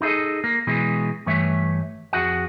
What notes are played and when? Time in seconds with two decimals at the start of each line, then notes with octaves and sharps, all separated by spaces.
0.01 D#4 E4 G#4 A4 D#5
0.44 A#3
0.67 B2 E3 G#3
1.26 G2 E3 A3 C#5 E5
2.13 F2 F#4 G#4 F#5